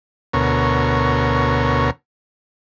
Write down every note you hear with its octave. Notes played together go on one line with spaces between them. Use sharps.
D2 B2 A#4 C#5